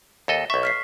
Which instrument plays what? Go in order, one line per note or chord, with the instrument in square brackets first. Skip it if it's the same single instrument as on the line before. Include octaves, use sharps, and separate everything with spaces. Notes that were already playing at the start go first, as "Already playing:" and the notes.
[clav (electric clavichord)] D#2 A4 D#5
[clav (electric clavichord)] B1 E5 [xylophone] C#6
[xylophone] F6 B6 C7